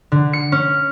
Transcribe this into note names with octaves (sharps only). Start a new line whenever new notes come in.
D3
C#7
C#4